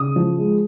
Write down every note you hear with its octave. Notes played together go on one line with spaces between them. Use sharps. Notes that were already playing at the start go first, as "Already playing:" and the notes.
Already playing: C#3 D#6
F3
G#3